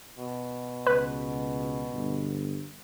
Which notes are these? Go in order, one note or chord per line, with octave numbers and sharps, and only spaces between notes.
B2
C#2 B4
G1